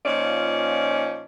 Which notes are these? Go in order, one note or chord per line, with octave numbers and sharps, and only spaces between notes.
A#2 F3 C#4 D#4 D5